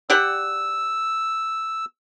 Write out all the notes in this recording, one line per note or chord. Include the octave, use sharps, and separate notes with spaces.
G4 D5 F#5 E6